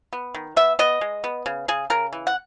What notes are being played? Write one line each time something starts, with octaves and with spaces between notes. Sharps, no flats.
B3
D#3
B3 E5
B3 D#5
G#3
B3
C#3
C#3 G#4
C#3 A#4
E3
F#5